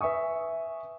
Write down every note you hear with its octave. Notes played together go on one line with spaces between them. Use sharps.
B4 E5 G#5 C#6 D#6